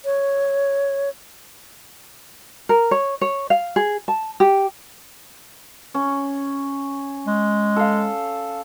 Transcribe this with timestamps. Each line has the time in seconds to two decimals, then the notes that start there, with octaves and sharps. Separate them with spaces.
0.05 C#5
2.69 A#4
2.91 C#5
3.21 C#5
3.50 F5
3.76 G#4
4.08 A5
4.40 G4
5.94 C#4
7.26 G#3
7.76 A4 F5